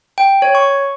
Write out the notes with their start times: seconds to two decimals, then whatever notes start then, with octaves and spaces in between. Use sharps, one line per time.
0.18 G5
0.42 C#5
0.55 C#6